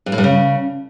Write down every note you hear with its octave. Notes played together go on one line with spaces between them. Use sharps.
G2
A2
G2
C#3